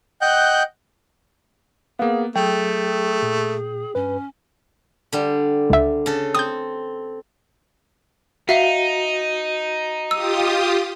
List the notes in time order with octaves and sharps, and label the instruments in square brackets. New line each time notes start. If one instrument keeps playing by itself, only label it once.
[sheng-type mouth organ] D#5 F#5 G5 F#6 G6
[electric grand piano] A#3 B3 [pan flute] G#4 [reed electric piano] F5
[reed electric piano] F#3 [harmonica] A3 [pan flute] G#4 [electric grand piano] G5
[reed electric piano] A#2
[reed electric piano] G2 B4 [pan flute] C#4
[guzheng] D3 G3
[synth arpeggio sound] C#2 E5
[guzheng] C#3 A4
[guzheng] C4 [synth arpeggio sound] D#6 G6
[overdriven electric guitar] D#4 [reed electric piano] F#4 [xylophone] E5 F5
[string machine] F4 G4 D#6 [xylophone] E6